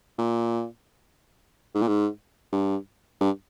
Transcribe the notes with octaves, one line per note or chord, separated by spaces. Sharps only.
A#2
G#2
A#2
G#2
G2
G2